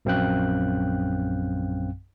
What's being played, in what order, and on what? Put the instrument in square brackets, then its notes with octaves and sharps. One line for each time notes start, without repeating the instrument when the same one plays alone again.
[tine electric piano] A#1 F#2 C4 F5 G5 F#6